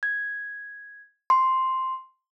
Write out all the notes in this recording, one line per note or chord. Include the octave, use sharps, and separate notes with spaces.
G#6
C6